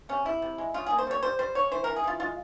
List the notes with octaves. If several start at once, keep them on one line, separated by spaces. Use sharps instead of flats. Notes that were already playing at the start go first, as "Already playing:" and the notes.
C3 C#4
C3 E4
C3
G#3
C#3 F4
A#3 G#4
C5
G3 C#5
G3 C5
G3 C5
C#3 C#5
E3 C5
E3 A#4
G#4
E3 F4
G#3 F4